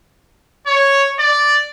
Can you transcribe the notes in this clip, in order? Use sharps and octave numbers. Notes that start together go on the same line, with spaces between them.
C#5
D5